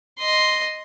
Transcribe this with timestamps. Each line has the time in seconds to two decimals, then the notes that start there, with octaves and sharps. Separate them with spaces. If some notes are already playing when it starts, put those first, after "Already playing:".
0.19 D#5 C6